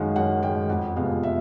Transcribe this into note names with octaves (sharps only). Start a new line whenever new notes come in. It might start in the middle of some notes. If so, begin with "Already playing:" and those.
Already playing: F#2 D#3 G#3 F5 F#5
F#2 F#5
D#3 G#3 G5
F2 F#5
C3 F3 G#3 B3 F5
E5